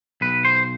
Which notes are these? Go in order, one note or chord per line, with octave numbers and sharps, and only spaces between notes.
B1 B4
C5